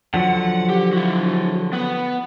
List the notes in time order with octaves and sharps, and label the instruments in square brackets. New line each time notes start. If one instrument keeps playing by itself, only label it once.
[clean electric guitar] D3 F3 F#3 [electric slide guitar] F#5
[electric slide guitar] G4
E4 F#4
B3 B4